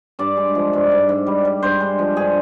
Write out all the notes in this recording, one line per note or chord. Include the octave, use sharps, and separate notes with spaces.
G2 D5
G#3
F3
G2
G#2
G#2
G3
G3
G2 C5
G#3
F3
G2 G#4